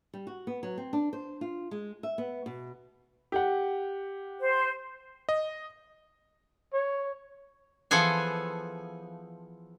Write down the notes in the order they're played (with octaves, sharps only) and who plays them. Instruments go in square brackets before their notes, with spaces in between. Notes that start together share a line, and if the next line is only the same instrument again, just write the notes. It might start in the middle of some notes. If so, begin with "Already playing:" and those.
[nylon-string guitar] G3
F#4
B3
F#3
C4
D4
C5
F4
G#3
E5
B3
B2
[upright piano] G4 F#5
[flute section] C5
[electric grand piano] D#5
[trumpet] C#5
[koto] E3 F3 B3 G#4 A4 G#5